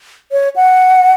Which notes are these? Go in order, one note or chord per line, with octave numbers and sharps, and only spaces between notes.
C#5
F#5